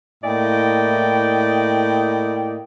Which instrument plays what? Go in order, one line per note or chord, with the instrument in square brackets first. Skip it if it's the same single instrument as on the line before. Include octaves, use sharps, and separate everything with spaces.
[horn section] A2 A#3 E4 D5 D#5 G5